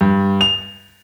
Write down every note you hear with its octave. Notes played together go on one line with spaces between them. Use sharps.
G2
F7